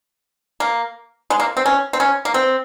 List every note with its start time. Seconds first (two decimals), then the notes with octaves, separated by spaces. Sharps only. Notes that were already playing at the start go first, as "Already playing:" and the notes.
0.60 A#3
1.30 G#3
1.40 A#3
1.57 C4
1.66 C#4
1.93 C4
2.00 C#4
2.25 A#3
2.34 C4